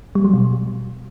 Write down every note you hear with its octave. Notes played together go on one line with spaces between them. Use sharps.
G3
F#3
B2